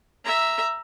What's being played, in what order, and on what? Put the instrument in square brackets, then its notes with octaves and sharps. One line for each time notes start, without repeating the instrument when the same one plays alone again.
[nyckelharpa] E5 A#5